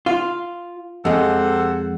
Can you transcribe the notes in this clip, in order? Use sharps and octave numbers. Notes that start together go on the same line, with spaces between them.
F4
F2 C3 G#3 A4 F#5